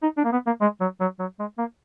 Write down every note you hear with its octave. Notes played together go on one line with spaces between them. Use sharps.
D#4
D4
A#3
B3
A#3
G#3
F#3
F#3
F#3
G#3
A#3